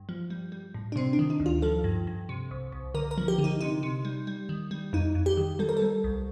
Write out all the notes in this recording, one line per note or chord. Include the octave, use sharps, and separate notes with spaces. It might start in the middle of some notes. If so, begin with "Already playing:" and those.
Already playing: G2
F3
G3
G3
A2
D4
C3 C4
D4
D#3
D#4
D2
F4
F3 A4
G2
G2
C3
C2
C2
D3 A#4
A#4
F3
G4
D3
D#4
C3 D#4
C3
G3
G3
D#3
G3
F2 D#4
F2
G4
D#3
G3 A4
A#4
A4
G3
C2